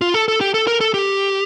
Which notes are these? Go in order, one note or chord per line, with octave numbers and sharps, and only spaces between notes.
F4
A4
A4
G4
A4
A#4
A4
G4